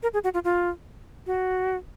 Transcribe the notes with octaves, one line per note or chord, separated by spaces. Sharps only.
A#4
G#4
F#4
F4
F4
F#4